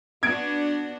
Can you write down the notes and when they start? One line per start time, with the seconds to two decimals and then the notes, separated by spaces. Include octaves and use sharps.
0.23 B3 D4 F#4 G#6 D7